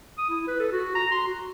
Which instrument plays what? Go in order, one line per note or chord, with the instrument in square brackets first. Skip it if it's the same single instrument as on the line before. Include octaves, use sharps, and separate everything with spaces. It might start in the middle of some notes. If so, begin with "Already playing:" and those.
[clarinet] D#6
E4
B4
A4
F#4
A#5
C6
F#4